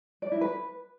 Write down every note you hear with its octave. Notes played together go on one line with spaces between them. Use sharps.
D5
E4
B4